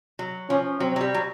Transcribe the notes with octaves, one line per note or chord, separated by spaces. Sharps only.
F#3
F3 C#4
F#3 C4
F#3
G3
F#3